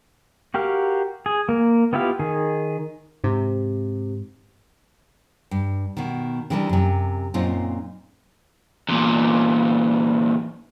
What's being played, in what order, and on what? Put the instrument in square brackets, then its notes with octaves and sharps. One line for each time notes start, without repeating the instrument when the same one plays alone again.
[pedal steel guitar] F#4 G4 A#4 F5
G#4
A#3 A#4
B3 E4 F4 G4 F5
D#3 G#4
[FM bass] G#2 [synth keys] C3
[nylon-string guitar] G2
B2 D#3
C3 D#3 E3 G3 B3 D4
F#2 C3
F#2 A#2 C4 C#4 D#4 F4
[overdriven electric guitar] E2 A#2